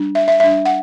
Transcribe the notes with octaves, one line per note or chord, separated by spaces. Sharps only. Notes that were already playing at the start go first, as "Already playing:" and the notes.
Already playing: G3 D4
E5
E5
G3 D4 E5
F#5